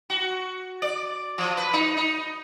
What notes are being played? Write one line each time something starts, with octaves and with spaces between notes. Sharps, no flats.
F#4
D5
F3
B4
D#4
D#4